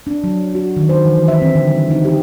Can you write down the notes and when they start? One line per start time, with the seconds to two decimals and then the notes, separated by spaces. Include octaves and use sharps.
0.07 D4
0.24 F#3
0.55 F#4
0.76 D#3
0.89 C5
1.06 E3
1.28 E5
1.42 C4
1.55 D3
1.69 G3
1.91 D#4
2.05 G4